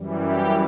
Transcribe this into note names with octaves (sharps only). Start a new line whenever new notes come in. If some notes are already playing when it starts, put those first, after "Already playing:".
Already playing: F#2 E3 G3
G4